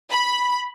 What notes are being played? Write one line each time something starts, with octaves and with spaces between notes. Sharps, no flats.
B5